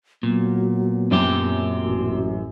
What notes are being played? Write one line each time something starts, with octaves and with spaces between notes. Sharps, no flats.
A#2 F#3 B3
F#2 A#2 C4 G4
A1 F#4